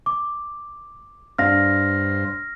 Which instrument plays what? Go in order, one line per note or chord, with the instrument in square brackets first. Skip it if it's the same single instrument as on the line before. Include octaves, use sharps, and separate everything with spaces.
[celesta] D6
[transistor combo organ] G2 C5 [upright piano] D4 F5 [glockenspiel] F6 A#6